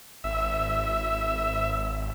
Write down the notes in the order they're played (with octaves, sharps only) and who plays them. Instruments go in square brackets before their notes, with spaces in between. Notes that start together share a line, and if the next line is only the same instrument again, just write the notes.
[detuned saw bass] G#1 [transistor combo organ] E5